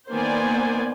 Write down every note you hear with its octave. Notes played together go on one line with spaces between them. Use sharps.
D#3 A#3 B3 C5 D5 G#5